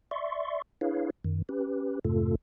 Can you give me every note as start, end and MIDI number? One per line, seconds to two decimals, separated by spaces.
0.11 0.62 74
0.11 0.62 76
0.11 0.62 84
0.11 0.62 85
0.81 1.10 62
0.81 1.10 64
0.81 1.10 68
0.81 1.10 71
0.81 1.10 73
0.81 1.10 77
1.24 1.42 42
1.24 1.42 51
1.49 1.99 61
1.49 1.99 67
1.49 1.99 71
2.05 2.35 41
2.05 2.35 44
2.05 2.35 48
2.05 2.35 57
2.05 2.35 65
2.05 2.35 69